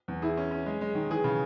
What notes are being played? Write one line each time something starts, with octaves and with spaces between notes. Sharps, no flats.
E2
E4 G#4
C#4
C#4
G#3
G#3
D#3
E3 G#4
C#3